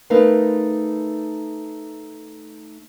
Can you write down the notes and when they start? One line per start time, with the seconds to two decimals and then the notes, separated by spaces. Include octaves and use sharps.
0.10 A3 D#4 A#4 B4 F5